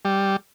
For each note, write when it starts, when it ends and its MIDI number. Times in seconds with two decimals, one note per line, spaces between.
0.05 0.36 55